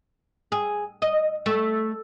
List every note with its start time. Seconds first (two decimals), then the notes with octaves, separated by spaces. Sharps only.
0.52 G#4
1.02 D#5
1.46 A3